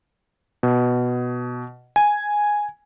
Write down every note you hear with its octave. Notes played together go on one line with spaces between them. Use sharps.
B2
G#5